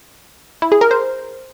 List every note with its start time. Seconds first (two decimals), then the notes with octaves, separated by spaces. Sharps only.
0.62 E4
0.72 G#4
0.81 A#4
0.91 C5